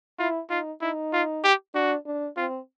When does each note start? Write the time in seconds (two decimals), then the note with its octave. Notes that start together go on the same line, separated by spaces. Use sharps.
0.19 E4 F4
0.50 D#4 F4
0.81 D#4 E4
1.13 F4
1.44 G4
1.74 D4 F#4
2.06 D4
2.37 C4 F4